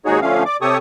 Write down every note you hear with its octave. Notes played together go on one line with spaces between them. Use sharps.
D#2 G#2 D#4 F#4 G#4 C#5
D3 F3 A3 C#4 F5
D5 D6
C3 G4 A4 C#5 C#6 D#6